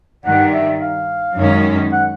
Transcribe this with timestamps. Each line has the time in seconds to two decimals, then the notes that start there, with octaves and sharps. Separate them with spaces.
0.25 G2 D#3 G3 F#5
0.53 E5
0.81 F5
1.36 F#2 D#3 G#3 C#4
1.92 F#5